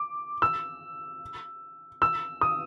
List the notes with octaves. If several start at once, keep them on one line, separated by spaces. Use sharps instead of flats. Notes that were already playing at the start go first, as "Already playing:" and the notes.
Already playing: D6
E6
E6
D#6